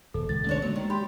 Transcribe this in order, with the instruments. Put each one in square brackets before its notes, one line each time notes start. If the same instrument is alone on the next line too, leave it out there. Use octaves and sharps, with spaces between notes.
[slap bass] D#1 [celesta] A4
[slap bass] C#2 [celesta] A6
[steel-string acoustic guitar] A#2 D4 C#5 [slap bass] D3 A3 C#4
[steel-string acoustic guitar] F#3 [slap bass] G#3 A#3
[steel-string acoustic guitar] D#3
[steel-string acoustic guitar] G4 [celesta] B5 C6